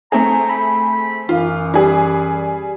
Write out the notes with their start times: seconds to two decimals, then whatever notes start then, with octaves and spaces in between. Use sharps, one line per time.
0.12 A3 C4 G#4 A#5
0.49 B5
1.29 F#2 E3 F4
1.74 G3 G#4